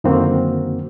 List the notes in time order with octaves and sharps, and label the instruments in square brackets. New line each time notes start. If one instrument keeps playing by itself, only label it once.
[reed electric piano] F#2 D3 D#3 A#3 C4 F#4